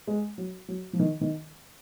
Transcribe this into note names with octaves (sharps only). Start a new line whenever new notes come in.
G#3
F#3
F#3
F3
D#3
D#3